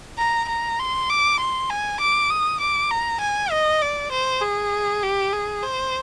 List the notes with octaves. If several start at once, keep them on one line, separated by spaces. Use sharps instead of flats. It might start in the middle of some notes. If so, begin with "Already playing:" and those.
A#5
A#5
C6
D6
C6
G#5
D6
D#6
D6
A#5
G#5
D#5
D5
C5
G#4
G4
G#4
C5